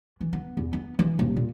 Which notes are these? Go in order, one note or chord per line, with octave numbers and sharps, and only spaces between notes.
E3
B3
E2
B3
E3
D#1
A#2